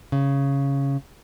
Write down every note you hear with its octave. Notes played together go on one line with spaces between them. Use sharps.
C#3